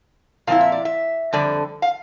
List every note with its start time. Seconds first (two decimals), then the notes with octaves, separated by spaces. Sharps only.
0.47 A#2 F3 C4 E4 F5
0.61 E5
0.72 D5
0.85 E5
1.33 F2 D3 G3 D5
1.82 F5